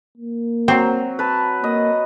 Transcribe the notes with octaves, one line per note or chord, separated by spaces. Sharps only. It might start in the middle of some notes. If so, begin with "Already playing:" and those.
A#3
F#3 C4
B4 A5
A#3 D#5